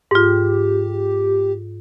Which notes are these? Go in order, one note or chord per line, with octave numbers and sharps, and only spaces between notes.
G#2 F4 G4